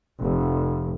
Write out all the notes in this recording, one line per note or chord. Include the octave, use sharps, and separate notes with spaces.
F1